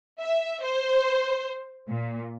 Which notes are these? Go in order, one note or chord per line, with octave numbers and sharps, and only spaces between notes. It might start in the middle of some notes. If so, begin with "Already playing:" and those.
E5
C5
A#2